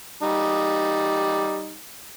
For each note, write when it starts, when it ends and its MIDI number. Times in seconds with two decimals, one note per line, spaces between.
0.23 1.77 55
0.23 1.77 63